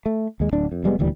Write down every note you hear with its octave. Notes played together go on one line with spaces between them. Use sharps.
A3
D#2 G#3
D1 D4
F2
F1 G3 G#3 B3
D#1 D2 E3 G3